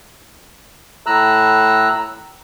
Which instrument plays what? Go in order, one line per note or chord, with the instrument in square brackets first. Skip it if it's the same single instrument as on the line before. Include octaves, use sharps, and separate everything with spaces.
[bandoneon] A2 A#5 E6 F#6